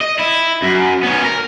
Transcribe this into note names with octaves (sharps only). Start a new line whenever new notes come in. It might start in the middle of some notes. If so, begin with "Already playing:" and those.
D#5
E4
F#2
B3 C#4
A#4